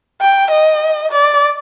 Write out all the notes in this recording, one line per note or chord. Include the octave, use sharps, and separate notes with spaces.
G5
D#5
D5